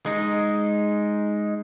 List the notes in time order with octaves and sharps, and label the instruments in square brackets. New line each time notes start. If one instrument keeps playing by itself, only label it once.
[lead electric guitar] G#3 D#4